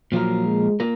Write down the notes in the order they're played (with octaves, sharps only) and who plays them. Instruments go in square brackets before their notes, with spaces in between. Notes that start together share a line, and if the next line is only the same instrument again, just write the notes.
[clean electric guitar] A#2 F3 A#3 F4 A#4 [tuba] F#3
[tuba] G#3
[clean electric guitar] A#3 F4 A#4